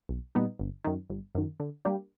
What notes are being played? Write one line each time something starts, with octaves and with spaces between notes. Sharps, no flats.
B1
A#2 G3 B3 D#4
G1
F#2 D#3
G1
F#2 D#3
D3
G3 A#3 D4 G4